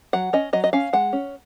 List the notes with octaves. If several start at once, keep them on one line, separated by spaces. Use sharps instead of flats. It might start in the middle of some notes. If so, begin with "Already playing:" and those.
F#3 F#5
C#4 D#5
F#3 D#5
D#5
C#4 F5
G#3 F#5
C#4